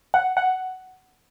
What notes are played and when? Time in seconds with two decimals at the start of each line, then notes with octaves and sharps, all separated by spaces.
0.14 F#5
0.37 F#5